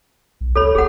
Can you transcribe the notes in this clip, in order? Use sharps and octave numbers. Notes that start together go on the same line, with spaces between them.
B1
C#2 A4 C#5 B5
E1 G#4 A4 F#5